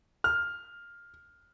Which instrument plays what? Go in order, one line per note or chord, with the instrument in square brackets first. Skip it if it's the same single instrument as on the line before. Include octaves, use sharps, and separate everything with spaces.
[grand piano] F6